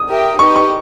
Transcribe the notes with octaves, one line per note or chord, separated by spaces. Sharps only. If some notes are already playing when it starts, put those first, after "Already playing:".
Already playing: D#6
G4 A#4 E5 G5
D#4 G4 B4 D#5 C#6
C#6